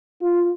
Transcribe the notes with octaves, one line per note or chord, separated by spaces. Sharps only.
F4